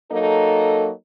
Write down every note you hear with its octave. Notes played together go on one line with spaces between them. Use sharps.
F#3 A#3 D#4 A4